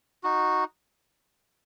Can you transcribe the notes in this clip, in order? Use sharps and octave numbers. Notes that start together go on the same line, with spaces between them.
D#4 F#4